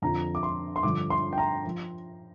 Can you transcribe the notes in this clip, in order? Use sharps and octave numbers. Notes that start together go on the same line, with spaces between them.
F2 D3 F3 A#5
D6
C6
C6
G2 D3 F3 D6
C6
G5
A#5
F3